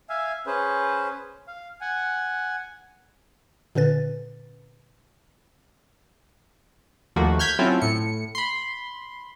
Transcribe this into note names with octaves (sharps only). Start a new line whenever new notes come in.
E5 F5 G#5
C#4 G#4 B4 C5
F5
F#5 G#5
A#2 D3 C#4 B4 A6
D#2 F3 A3 A#3 F#4
F6 G6 G#6 B6
F#3 A3 C4 C#4 E4 F4
A2 C#7
B5 C6